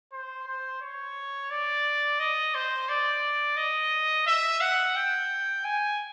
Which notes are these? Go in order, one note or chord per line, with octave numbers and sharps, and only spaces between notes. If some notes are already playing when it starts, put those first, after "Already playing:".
C5
C5
C#5
D5
D#5
C5
D5
D#5
E5
F#5
G5
G#5